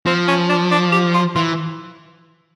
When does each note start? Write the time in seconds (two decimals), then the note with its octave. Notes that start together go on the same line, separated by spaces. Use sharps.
0.06 F3 C4
0.28 C#4
0.50 D4
0.72 D4
0.92 G4
1.14 F4
1.36 E3 F4